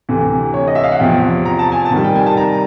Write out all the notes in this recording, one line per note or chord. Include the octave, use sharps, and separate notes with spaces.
D2 C3 E3
C#5
D#5
E5
F5
F#5
E2 C3 F3 G5
A#5
A5
G#5
A5
C3 D#3 G3
G5
G#5
A5
A#5